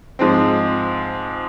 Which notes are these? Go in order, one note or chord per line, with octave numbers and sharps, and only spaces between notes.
G#2 F3 G#3 C4